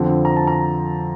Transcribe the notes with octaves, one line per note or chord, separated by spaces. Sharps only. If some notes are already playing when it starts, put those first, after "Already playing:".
Already playing: F2 D3 F3 C4
A#5
A5
A#5